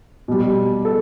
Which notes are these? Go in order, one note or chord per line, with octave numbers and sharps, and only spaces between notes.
B2 G3
A4